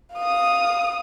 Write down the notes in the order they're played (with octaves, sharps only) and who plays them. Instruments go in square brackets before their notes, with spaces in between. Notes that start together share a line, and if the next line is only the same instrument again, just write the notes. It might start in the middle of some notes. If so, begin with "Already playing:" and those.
[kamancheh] F5 D#6